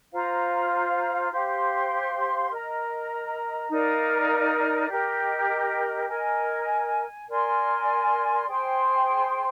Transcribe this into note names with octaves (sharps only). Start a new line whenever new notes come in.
F4 C5 F5 A#5
G4 C5 F5 C6
A#4 D#5 A#5
D#4 A#4 D5 F5
G4 A#4 D#5
A#4 D#5 G#5
A#4 D5 G#5 C6
G#4 C5 G5 C6